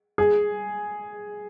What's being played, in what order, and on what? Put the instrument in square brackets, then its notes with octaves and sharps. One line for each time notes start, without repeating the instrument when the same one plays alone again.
[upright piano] G#4